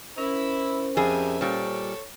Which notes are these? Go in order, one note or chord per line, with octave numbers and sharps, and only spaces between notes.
C#4 E4 A#4 C5 B5 E6
F2 G3 G#4 E5 G#5
A#2 G3 A4 C#5